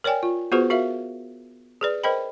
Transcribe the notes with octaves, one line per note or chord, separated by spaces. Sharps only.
A#4 C#5 D5 G5 G#5
F4
B3 F4 F#4 G#4 B4 C5
F#4 A#4 E5 F5
G#4 B4 D5
A#4 C5 D#5 G5 B5